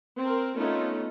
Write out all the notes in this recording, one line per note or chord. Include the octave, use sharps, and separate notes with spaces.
C4 A#4
A3 B3 C#4 D#4 F4